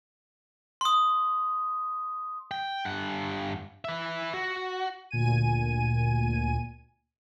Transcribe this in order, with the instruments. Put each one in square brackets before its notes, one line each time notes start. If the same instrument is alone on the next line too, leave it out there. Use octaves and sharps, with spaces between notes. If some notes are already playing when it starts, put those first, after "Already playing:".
[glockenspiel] C6 D#6
[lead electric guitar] G5
G2 F#5
B4 E5
F#4
[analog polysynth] D2 A#2 G#5 D#7